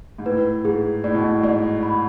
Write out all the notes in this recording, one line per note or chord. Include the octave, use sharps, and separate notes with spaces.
G#2
A2 B4
G#2 G#4
A2 D5
B2
A2
G#2 D5
B5